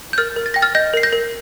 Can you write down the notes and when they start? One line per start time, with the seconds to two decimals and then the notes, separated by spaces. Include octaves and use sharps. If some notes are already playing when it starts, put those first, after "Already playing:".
0.13 G6
0.18 A#4 F6 A6
0.36 A#4
0.46 A6
0.54 G5 A#6
0.62 F6 A6
0.75 D#5 G6 A#6
0.94 A#4 C7
1.03 G6 A#6
1.13 A#4